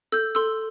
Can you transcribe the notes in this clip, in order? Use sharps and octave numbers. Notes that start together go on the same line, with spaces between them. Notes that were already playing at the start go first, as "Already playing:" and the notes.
A4 E6 G6
A4 C6 E6